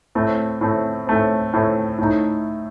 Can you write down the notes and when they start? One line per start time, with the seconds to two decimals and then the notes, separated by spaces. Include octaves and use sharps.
0.15 A2 A3 C4
0.61 A2 A3 C4
1.07 A2 A3 C4
1.53 A2 A3 C4
1.98 A2 A3 D#4